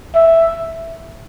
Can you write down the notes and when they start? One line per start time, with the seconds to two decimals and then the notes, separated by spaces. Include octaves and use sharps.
0.15 E5